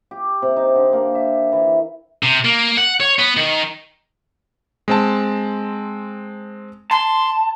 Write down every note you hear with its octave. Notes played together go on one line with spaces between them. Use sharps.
G4
C3
D#4
D3
A#3
E5
E3
C3
A#3
F#5
C#5
B3
D#3
G#3 C4 A5
A5 C6